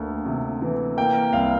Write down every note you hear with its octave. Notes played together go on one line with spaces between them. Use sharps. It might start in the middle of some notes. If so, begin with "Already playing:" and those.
Already playing: D2 A#3
C3
E3
A#3 G5
C2 F5